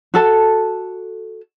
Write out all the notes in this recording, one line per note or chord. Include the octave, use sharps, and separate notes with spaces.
F#4 A4 A5